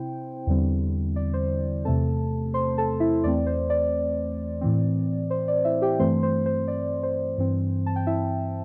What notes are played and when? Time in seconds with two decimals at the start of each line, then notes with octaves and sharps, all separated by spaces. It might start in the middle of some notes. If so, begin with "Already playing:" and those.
Already playing: C3 C4 E4 C5 G5
0.47 E2 D3 G3 C4
1.16 D5
1.33 C5
1.85 E2 C3 A3 C4 A4 A5
2.54 C5 C6
2.78 A4 A5
3.00 E4 E5
3.24 E2 E3 A3 C4 D5
3.46 C5
3.70 D5
4.61 A2 E3 C4
5.30 C5
5.48 D5
5.65 E4 E5
5.82 G4 G5
5.99 G2 E3 A3 C4 C5 C6
6.23 C5
6.46 C5
6.68 D5
7.03 C5
7.38 G2 E3 C4
7.86 A5
7.96 G5
8.07 E4 E5